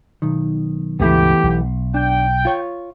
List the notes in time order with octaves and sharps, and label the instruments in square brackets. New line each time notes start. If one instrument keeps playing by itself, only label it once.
[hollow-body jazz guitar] B1 D#3
[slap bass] C#2 G2 B2 [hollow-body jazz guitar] E3 A3 B3 [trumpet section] G4
[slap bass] B1
[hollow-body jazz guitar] D4 [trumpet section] G5
[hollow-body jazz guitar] F4 C#5